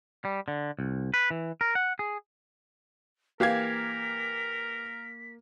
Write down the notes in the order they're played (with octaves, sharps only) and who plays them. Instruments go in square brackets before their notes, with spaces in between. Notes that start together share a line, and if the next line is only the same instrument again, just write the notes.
[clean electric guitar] G3
D3
C2
B4
E3
A#4
F#5
G#4
[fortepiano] E3 G4 F5 [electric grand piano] A#3 G#6 [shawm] A#4 [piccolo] B6